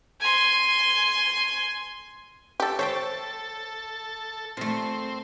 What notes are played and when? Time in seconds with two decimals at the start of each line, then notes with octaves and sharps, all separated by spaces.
0.21 G#5 C6
2.60 G4 A4
2.79 A4 C5 C#5 E5 G5
4.57 A#2 A3 C4